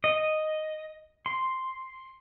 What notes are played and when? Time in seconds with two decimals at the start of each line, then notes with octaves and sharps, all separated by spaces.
0.04 D#5
1.26 C6